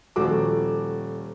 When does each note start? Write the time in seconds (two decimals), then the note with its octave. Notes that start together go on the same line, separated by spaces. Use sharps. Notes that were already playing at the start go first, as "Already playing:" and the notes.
0.16 D#1 F3 A3 F#4 D6